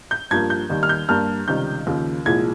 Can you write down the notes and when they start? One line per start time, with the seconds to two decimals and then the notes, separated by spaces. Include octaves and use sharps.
0.11 G6
0.31 G2 F3 A#3 G#6
0.50 G6
0.70 D#2 D#3 G3
0.83 F6
0.89 G6
1.09 G2 G3 A#3 F6
1.48 C#2 C3 D#3 G3 G6
1.87 D#2 C#3 F3
2.26 C2 A#2 F3 G#3 G#6